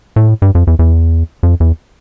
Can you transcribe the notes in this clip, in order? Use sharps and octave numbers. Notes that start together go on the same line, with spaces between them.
A2
G2
F2
E2
E2
F2
E2